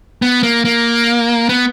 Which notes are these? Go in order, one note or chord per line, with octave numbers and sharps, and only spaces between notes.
B3
A#3
A#3
B3